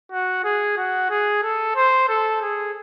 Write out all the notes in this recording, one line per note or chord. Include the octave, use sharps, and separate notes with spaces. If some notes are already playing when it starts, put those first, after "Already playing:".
F#4
G#4
F#4
G#4
A4
C5
A4
G#4